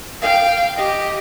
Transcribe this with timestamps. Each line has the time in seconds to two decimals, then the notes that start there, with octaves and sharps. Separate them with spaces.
0.22 F5 G5
0.75 G4 D#5